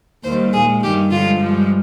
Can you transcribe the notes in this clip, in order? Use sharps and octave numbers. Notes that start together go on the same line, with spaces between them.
D#2 D#3 G3 C5
A#2 G#3 G#4
G2 D#3 G3 G4
G2 D3 F3 G#3 F4
G2 F3 G#3